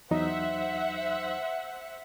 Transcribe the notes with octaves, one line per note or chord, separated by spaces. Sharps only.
E2 F#3 D#4 C5 E5 F#5